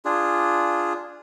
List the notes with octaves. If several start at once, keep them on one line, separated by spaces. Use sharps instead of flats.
D4 F4 G#4